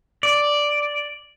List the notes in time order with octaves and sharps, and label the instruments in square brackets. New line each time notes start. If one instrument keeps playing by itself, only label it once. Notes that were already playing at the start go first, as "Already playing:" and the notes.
[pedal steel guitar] D5